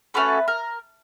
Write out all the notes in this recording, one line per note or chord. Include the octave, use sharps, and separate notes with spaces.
A3 C#4 F#4 A4 B4
A#4